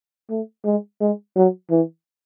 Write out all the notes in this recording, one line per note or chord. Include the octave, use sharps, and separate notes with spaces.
A3
G#3
G#3
F#3
E3